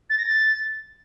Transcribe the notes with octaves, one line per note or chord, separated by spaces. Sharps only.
A6
A#6
A6